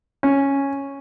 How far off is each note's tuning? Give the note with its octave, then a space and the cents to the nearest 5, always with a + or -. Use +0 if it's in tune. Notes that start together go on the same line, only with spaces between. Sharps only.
C#4 -5